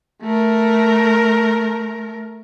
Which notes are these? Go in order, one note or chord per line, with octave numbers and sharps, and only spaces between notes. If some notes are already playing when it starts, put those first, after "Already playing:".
A3 A#4